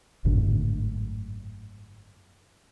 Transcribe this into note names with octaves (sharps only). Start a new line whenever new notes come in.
G#1 F#2 A2 D3